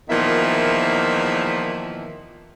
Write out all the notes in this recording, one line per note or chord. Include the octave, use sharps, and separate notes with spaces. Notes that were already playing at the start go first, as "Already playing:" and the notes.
E2 A#2 D#3 F3 E5